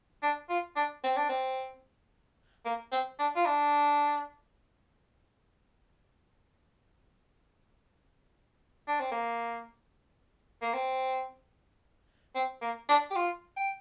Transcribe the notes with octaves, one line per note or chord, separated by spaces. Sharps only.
D4
F4
D4
C4
D4
C4
A#3
C4
D4
F4
D4
D4
C4
A#3
A#3
C4
C4
A#3
D4
G4
F4
G5